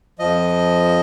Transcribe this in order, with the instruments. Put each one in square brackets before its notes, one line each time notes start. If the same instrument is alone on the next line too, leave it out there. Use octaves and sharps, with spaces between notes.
[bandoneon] F2 F3 D#5